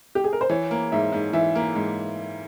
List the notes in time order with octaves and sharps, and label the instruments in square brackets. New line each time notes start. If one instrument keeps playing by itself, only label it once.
[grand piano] G4
G#4
A#4
C5
[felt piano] E3 [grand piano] C#5
[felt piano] A#3
[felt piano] G#2 [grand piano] E5
[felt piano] G#2
[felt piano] E3 [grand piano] E5
[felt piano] A#3
G#2